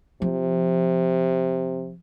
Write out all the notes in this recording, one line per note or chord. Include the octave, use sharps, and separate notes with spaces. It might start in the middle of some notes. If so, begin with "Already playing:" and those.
C3 F3